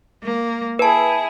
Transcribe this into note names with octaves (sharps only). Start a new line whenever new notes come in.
A#3
E4 G#4 B4 A5